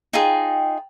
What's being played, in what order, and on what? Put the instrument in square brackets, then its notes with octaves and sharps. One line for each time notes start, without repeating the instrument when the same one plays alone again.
[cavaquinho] D#4 F4 G#4 [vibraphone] G5